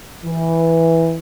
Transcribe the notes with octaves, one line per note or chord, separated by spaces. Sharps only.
E3